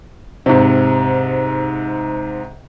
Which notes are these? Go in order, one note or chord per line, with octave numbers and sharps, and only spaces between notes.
G#2 C3